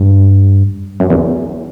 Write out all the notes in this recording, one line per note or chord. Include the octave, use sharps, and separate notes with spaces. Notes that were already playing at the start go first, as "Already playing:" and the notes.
Already playing: G2
F#2
E2